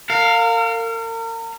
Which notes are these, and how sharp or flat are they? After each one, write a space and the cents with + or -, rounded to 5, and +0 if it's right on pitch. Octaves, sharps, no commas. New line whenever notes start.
A#4 -35 F5 +10